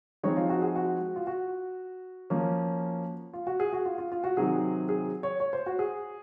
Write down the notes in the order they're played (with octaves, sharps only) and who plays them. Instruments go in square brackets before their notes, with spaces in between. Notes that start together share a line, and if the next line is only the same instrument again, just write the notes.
[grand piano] F3 G#3 C4 D#4 C#5
F4
F#4
G#4
F#4
F4
F#4
F3 A#3 C#4
F4
F#4
G#4
F#4
F4
F4
F4
F#4
C3 D#3 F#3 C4 G#4
G#4
C#5
C#5
C5
F#4
G#4